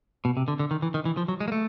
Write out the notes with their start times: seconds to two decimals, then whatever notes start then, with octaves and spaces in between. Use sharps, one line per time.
0.25 B2
0.37 C3
0.48 D3
0.59 D3
0.71 D#3
0.82 E3
0.94 D#3
1.05 E3
1.17 F3
1.28 F#3
1.40 G#3
1.48 A#3
1.52 A3